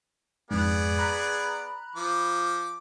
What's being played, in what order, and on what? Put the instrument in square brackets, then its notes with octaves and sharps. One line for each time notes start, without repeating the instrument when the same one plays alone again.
[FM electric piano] F2 G#2 [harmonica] B3 G#4 D5
[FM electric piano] A#5 B5 F#6
[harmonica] F3 D6